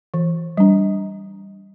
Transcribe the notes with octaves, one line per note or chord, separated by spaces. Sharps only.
E3
G3 D4